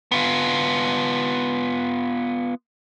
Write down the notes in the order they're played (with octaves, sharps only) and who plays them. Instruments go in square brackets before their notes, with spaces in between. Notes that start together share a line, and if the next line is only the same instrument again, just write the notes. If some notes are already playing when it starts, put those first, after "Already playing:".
[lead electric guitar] B3 F4